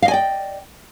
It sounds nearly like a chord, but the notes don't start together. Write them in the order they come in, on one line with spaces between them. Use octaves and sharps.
F5 D#5 G#5 D5 G5